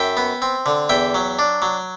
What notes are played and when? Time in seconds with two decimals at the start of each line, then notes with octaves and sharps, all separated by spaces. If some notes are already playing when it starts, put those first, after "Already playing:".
Already playing: F#2 E5 G5
0.17 B3
0.42 C4
0.66 D3
0.89 E2 E5 G5
1.15 F#3
1.39 D4
1.62 F#3